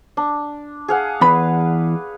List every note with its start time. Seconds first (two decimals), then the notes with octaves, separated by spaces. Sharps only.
0.17 D4
0.88 G#4 F5 F#5
1.21 E2 B4 B5